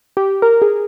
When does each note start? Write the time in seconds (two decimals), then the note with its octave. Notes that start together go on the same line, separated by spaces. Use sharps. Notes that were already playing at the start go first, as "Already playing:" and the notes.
0.17 G4
0.42 A#4
0.62 G#4